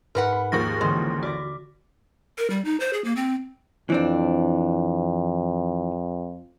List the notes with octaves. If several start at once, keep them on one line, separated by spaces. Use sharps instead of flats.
G#2 A#4 B4 F#5
B5
D#2 F3 A#3 G#4 C#6 A#6
A1 D3 G#3
F#4 D5 D6 A#6
A#4
G3
D#4
C5
G#4
A#3
C4
F2 E3 C4 D4